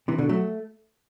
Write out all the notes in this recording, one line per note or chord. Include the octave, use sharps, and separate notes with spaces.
C3 E3
B2 D3
F#3 A3